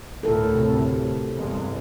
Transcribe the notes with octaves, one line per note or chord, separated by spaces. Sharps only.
D2 A2 A4 A#4
C3
E2 G2 G#3